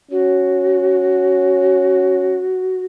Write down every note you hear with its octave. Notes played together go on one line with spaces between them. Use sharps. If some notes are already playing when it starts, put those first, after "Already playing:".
C#4 F#4